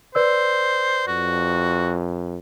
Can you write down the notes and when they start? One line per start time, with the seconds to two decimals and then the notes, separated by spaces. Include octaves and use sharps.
0.15 B4 C5 D5 E6
1.08 F2 F#4